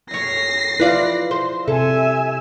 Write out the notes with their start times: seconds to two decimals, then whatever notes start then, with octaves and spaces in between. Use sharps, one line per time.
0.11 F#2 C#5 A#6 C7
0.79 E4 F4 B4 D5 F5
1.31 C5
1.68 C3 A4 E5 G#5